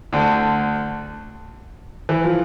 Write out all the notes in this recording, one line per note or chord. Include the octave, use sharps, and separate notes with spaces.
D2 D3
E3
F3